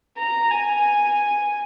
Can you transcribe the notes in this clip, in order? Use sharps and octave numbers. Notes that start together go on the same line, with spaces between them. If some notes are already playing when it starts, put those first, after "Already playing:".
A#5
G#5